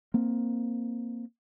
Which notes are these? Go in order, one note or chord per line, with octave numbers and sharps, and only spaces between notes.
A#3 C4